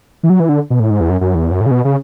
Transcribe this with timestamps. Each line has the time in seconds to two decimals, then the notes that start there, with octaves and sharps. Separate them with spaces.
0.23 E3
0.30 F#3
0.40 E3
0.49 D3
0.70 B2
0.80 A2
0.90 G#2
1.00 E2
1.10 F#2
1.21 F#2
1.35 E2
1.51 F#2
1.61 A2
1.66 C#3
1.71 B2
1.85 C#3